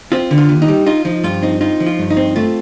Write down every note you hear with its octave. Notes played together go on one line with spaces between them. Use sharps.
C4 F4
D3
F4
D#2
D#4
G3
D#4 F4
F3 D#4
G2 F4
C4 D#4
D#4 F4
F3
F4
G2
D#4
C4
A3 F4